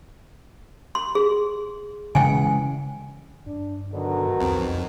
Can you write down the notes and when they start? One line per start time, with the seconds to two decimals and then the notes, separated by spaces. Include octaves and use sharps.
0.95 C6
1.15 G#4
2.15 C#3 E3 G#3 G5 G#5
3.46 G2 D4
3.92 B2 D3 D#3 F#3
4.40 C2 F2 C4